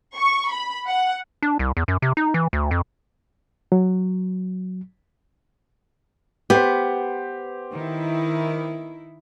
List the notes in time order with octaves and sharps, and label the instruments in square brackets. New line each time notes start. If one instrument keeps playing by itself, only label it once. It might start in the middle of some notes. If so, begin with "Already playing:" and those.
[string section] C#6
B5
F#5
[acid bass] D4
C2
E2
F#2
C3
D#4
E3
D2
F2
[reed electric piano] F#3
[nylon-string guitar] B3 [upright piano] G4 C5
[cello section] D#3 E4